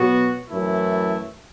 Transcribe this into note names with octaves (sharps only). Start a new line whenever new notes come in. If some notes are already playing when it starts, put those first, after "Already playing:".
Already playing: B2 F#3 B3 F#4
F#2 E3 A3 E4